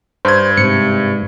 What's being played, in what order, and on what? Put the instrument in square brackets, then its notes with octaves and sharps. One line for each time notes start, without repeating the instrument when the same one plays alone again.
[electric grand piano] G2 G#6 [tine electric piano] C5
[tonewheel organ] G#2 [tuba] C3 [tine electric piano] C#7